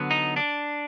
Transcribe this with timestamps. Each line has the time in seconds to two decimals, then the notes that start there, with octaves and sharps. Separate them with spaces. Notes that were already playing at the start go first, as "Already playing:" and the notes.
Already playing: D3 F#3 B3
0.11 D#4
0.36 D4